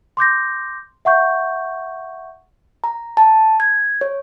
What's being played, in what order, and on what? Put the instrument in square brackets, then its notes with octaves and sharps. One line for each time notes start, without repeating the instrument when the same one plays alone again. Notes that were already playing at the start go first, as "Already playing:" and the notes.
[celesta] C6 D6 G6 A#6
E5 F#5 C#6 G6
[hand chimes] A#5
A5
G#6
C#5